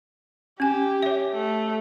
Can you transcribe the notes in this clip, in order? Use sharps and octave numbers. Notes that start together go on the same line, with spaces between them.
C#4 G4 G#5
C#5 E5
A3